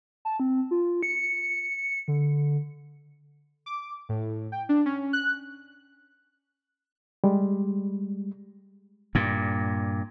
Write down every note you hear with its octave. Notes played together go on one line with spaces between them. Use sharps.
A5
C4
F4
C#7
D3
D6
A2
G5
D4
C#4
F#6
G3 G#3
G2 A#2